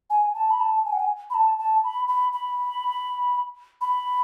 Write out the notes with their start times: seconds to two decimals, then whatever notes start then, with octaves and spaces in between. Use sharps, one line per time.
0.10 G#5
0.34 A5
0.51 B5
0.60 A5
0.85 G#5
0.92 F#5
0.99 G#5
1.30 B5
1.34 A5
1.59 A5
1.84 B5
2.08 B5
2.33 B5
3.81 B5